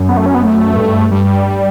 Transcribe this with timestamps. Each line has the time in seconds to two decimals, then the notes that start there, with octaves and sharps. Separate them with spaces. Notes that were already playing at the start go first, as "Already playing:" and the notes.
Already playing: F#2
0.09 B3
0.17 A3
0.26 C#4
0.35 B3
0.43 A3
0.77 G2
1.12 G2 G3